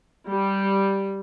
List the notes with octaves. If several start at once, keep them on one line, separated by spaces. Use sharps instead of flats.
G3